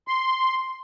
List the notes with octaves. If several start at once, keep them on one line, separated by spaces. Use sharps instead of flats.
C6